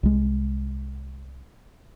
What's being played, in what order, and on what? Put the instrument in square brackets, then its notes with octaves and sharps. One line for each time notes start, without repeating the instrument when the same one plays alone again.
[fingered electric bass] C2 G#3